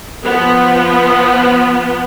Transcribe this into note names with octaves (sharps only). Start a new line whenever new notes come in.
F3 B3